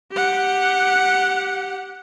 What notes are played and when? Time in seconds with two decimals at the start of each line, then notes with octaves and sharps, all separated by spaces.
0.12 G4 F#5